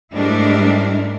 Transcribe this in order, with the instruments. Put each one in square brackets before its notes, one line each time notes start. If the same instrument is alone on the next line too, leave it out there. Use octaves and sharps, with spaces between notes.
[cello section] G#2 G3 A3 D4 E4 A#4